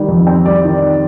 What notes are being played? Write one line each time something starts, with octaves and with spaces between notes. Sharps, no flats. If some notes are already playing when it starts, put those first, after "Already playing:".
Already playing: D#3 G3
F2
C4
G3 D5
D#3